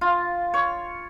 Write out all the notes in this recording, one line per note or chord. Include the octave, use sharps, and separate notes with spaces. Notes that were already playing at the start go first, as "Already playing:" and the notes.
F4
C#5